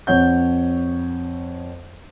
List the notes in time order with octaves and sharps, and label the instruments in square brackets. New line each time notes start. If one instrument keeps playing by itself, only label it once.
[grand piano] F2 C#5 F#5 G6